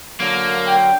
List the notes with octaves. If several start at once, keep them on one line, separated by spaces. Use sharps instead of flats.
D3 F#3 A#3
G5